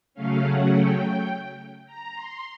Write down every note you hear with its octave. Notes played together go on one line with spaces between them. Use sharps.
C#3 F#3 A3 C#4 F5
F#5
G5
A#5
C6